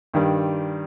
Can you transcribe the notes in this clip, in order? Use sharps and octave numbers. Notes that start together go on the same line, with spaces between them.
G2 D#3 G3